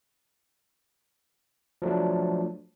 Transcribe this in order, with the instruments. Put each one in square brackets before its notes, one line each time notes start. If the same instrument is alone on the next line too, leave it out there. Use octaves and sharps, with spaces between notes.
[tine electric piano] F3 F#3 A3 D4